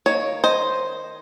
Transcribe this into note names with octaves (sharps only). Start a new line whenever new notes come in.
D#3 A#3 C#5
C5 D#5